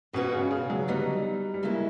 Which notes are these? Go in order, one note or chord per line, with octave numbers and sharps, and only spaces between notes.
B2 G#3 C#4 F#4 B4
C#3
C#3
F#3
D3 F#3 G3 B3 D#4
G3
C#3 F#3 G#3 A#3 C#4 E4